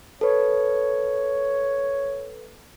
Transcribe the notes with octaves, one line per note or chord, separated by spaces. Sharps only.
A4 B4 C#5